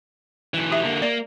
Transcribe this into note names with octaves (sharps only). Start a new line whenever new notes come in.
B1 E3
G4 E5
D3 A#3
A#3 D5